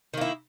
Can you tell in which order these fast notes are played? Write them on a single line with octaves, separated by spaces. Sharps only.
D#3 A#3 E4